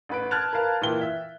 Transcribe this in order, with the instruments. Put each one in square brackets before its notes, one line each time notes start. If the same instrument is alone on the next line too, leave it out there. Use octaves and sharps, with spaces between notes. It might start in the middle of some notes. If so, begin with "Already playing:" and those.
[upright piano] A1 B4 D7
A5 F6 F#6 G#6 A6 F7
A#4 B4 F5 A5
A#2 E3 G5 G7
E5